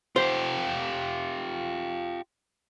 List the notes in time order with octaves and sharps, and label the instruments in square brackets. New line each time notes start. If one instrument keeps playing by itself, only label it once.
[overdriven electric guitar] F4 G4 [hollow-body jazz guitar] C5